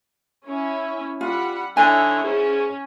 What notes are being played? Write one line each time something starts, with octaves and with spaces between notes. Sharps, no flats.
C#4 E4
G3 F4 F#5 B5
D3 D#4 E4 C#5 G#5
G#2 C#4